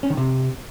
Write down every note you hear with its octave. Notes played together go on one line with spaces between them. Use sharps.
C#4
D#3
C3